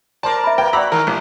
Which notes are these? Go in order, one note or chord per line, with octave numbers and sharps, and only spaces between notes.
A#4 C5 D5 A5
E5 B5
A#3 B4 G5
F#4 D5 F#5 A#5 B5 D6 E6
D#3 A#4 A#5 C#6
A#1 C3